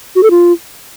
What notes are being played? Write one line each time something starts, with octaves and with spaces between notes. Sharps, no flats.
F#4
A4
F4